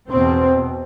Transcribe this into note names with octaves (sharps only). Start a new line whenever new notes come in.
E2 B2 C4